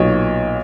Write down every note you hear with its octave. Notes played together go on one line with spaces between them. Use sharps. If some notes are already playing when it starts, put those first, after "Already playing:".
Already playing: B1 A#2 F#3 B3 D#4 C#5